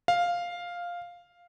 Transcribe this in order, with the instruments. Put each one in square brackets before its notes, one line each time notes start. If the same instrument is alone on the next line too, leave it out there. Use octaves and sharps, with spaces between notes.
[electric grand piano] F5